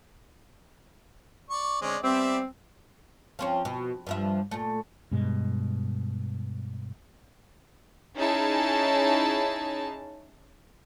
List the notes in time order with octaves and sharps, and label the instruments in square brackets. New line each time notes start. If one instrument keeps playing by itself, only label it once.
[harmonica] D5 C#6
[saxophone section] D3 C4 D5 [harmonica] G#3 C#4
[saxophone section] G3 B3 C4 [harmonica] G4 D5 E5
[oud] F3 C4 C#4
B2
G2 F3 E5
A#2 A3
[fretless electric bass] G2 B2 G#3
[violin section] C#4 D#4 E4 G#4 A5